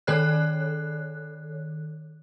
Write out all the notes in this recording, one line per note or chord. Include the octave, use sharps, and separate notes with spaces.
D#3 A4 C#5 F#6